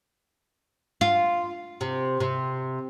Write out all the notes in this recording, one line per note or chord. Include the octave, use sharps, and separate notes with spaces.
F4
C3
C3